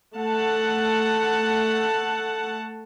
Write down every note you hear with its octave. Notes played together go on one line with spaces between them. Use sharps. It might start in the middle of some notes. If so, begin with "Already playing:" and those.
A3 F#5 A5